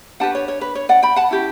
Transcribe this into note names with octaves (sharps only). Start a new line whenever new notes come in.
D4 G4 B4 F#5 A5
C#5
C#5
B4
C#5
D5 F#5
G5 B5
F#5 A5
C#4 E4 G4